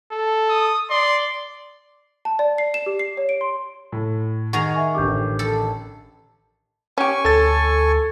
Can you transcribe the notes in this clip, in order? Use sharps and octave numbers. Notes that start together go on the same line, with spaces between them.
A4
D#6
D5 C6
A5
D5
C7
E7
G4
C7
C#5
D7
C6
A2
D#3 G#4 F#5 A#5 C#6 G#6
E5 G#5 C#6
A1 D3 G4 D6 G6
A4
C#4 G4 G#5 C#6
D2 A4 A6